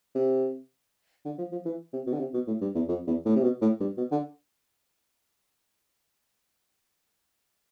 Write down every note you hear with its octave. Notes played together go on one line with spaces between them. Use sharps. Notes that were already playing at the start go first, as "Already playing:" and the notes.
C3
D3
F3
F3
E3
C3
B2
D3
C3
B2
A2
G2
E2
F2
E2
A2
C3
B2
A2
G2
B2
D3